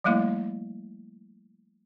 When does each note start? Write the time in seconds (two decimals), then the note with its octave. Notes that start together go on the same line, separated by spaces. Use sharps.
0.04 F3 G3 A3 A#3 E4